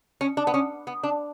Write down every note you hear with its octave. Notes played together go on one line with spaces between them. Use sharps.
C#4
D4
B3
C#4
B3
D4